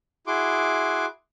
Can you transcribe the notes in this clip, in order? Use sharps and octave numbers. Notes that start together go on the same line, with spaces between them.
E4 F#4 G#4 C6 D6